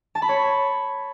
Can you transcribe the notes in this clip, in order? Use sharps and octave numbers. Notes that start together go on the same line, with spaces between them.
A5
B5
C#5